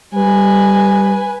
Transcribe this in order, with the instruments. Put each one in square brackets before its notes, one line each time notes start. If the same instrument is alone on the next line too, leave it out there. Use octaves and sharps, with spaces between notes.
[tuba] G3 [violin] B4 G#5